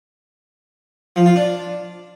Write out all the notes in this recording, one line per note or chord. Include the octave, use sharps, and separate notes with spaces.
F3
F4
D4